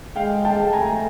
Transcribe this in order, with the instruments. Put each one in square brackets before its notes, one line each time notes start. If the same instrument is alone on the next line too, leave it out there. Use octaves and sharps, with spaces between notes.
[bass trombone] G#3 [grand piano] F5 G5
[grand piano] G5 A5
[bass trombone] A3 [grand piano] G#5 A#5